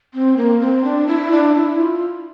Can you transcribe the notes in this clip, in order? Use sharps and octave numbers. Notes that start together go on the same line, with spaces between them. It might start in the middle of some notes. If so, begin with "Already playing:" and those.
C4
A#3
C4
D4
E4
D4
E4
F4